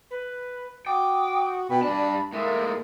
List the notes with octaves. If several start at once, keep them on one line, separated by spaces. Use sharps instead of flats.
B4
F#4 G5 D6 D#6
B2 G5 B5
G2 D4 D5 A5
A2 G#3 A#3 A#4 E5